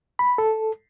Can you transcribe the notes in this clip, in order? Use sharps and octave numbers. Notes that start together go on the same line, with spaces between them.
B5
A4